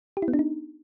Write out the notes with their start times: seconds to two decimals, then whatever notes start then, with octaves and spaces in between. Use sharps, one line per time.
0.17 G4
0.22 E4
0.28 B3
0.34 D4
0.39 D#4